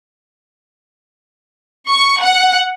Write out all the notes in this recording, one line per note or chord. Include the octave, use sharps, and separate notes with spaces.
C#6
F#5